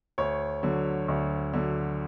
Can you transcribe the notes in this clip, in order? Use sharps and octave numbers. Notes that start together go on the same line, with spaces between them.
D2 C#5
D3 F#3
D2
D3 F#3